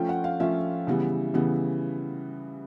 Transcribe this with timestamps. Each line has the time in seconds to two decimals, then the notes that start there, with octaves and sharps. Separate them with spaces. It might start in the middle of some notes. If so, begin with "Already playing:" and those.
Already playing: F3 A3 C#4 F4 G5
0.09 F#5
0.24 F5
0.40 F3 A3 C#4 F4 E5
0.87 C#3 E3 G3 B3
1.34 C#3 E3 G3 B3